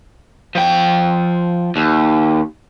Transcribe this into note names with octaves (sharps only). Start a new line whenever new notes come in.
F3 G5
D#2